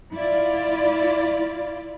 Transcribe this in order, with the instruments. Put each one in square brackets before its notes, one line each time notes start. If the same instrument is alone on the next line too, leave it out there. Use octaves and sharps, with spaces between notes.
[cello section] E4 F4 D5